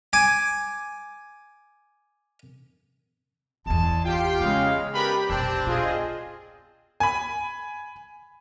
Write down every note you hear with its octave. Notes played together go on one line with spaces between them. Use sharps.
G#5 D6
G1 E2 G#3 A5
F4 G4 G5 C7
C#3 G#3 B3 F5
D4 G4 A#4 B4 B5
F1 B1 C4 D4
B2 F4 G#4 D#5
G#5 B5